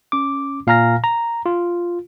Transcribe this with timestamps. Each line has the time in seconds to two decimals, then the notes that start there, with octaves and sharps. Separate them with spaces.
0.12 C#4 D6
0.67 A#2 F5 G#5 A#5 F6 A#6
1.04 A#5
1.46 F4